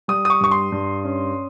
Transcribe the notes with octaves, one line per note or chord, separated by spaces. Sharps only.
G3 D#6
D#6
C#6
G2 C#6
C6
G2
C#4